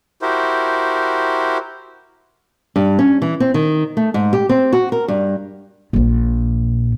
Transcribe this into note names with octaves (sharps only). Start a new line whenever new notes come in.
E4 F#4 G4 A#4 C5
G2
C#4
E3
C4
D#3
A3
G#2
G4
C4
F#4
A#4
G2
A#1 A#2